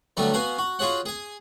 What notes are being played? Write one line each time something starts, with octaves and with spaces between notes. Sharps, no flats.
D3 F#3 G3 A3 B3
B3 F#4 F5 G#5 A#5
F#4
F4 F#4 G#4 C#5 F#5
G#4 G#5